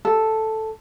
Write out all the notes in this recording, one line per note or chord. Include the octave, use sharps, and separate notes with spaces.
A4